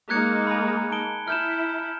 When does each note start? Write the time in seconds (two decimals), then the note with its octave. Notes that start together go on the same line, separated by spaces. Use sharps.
0.10 G#3 A#3 D#4 F#6 G#6 C#7
0.47 G#5 A#5 B5
0.92 A5 D7 G7
1.28 E4 F6 G6 E7